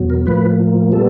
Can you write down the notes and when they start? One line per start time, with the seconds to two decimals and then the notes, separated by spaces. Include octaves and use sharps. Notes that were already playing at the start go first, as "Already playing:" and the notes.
Already playing: E2 B2 F#3
0.10 A#4
0.26 A2 F3 A#3 B4
0.92 A#2 G3 B3 A4